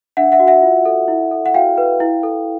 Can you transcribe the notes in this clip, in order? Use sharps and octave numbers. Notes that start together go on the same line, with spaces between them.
D4 E5 F#5
E5 F#5
F#4
E5 F#5
F4
A4
E4
A4
F#5
F#4 F5 G5
B4
E4
A4